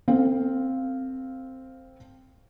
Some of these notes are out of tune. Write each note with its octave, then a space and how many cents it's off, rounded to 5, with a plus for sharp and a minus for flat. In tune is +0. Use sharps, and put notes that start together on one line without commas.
C4 +0 A4 +35 F5 +0